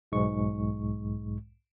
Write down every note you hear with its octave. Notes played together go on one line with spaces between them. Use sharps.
B1 G#2 G#3 C#6